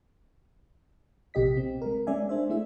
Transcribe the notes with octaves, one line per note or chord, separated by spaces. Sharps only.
A#1 C3 G4 D#5 B6
C4
G#3 A#4
G#3 C#4 D5 E5 G#5
D4 C5 E5
A3 E4 G#4 E5